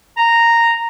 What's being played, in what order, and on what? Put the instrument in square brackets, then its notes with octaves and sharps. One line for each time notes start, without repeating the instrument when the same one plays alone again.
[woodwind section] A#5